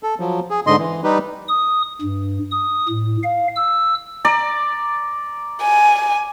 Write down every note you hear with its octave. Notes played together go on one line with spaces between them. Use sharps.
A4
F3 F#3
G#4
G#2 D3 D#5 C6
E3
G3 D#4 G4 B4
D#6
G2
D#6
A2
F5
E6
D5 A#5
G#5